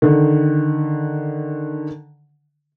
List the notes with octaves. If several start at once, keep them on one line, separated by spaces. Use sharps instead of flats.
D3 D#3